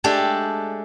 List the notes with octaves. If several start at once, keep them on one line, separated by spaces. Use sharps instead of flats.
G#3 A3 D4 G4 A4